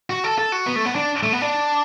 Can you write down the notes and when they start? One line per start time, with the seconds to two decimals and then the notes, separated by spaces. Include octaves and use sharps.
0.10 F#4
0.24 A4
0.38 A4
0.52 F#4
0.67 B3
0.76 A3
0.85 B3
0.95 D4
1.23 A3
1.33 B3
1.42 D4